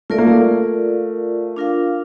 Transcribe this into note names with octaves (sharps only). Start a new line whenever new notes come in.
A3 F4 A#4 D5 F5
A#3
A3
D4 F4 A#4 F5